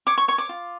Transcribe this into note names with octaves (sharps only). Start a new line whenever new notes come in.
C#5 D6
C#6
C#5 C#6
D6
F4